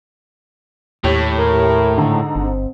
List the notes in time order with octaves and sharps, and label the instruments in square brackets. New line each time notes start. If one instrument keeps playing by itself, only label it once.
[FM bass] D#2 [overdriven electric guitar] A2 [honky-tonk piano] G4 C#5 C#6
[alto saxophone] A#4
[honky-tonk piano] G#2 D3 A#5
[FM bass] G1 [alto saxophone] C4